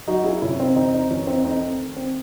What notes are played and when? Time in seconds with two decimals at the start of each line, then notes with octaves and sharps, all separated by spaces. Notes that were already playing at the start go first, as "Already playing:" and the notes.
0.07 F#3 D#4 F#4
0.24 E4 G#4
0.42 C3 C#4 E4
0.59 C4 D#4
0.76 E2 C4 D#4
0.94 C4 D#4
1.10 E2 C#4
1.27 C4 D#4
1.45 A3 C4 D#4
1.62 C4
1.79 D#3
1.96 C4